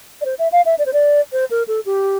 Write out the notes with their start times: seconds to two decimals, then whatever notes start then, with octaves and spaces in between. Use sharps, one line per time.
0.21 D5
0.25 C5
0.39 E5
0.52 F5
0.65 E5
0.79 D5
0.86 C5
0.93 D5
1.32 C5
1.50 A#4
1.68 A4
1.86 G4